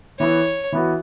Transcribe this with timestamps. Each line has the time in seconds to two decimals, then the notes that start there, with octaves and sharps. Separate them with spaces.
0.19 E3 B3 E4 C#5
0.72 E3 B3 F#4